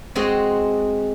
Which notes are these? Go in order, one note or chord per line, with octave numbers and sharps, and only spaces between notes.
G#3 C4 F#4 G#4 D#5